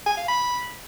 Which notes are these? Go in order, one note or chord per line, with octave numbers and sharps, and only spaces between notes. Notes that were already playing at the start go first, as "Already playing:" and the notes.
G#5
F5
B5